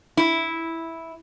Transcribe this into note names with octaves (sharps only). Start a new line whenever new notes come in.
E4